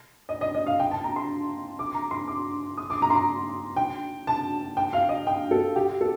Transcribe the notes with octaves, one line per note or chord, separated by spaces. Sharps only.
D#5
D#5
D#5
F5
G5
A5
A#5
C6
D6
A#5
C6
D6
D#6
D6
A#5
C6
A#5
G5
A5
G5
F5
D#5
G5
A4
G4
A4